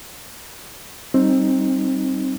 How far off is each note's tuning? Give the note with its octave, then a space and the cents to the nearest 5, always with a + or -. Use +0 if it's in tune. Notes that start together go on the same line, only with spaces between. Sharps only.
G3 -15 C4 +20 D#4 +0